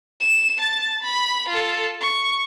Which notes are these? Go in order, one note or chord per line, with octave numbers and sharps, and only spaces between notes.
E7
A5 A6
B5
F4 A4
C#6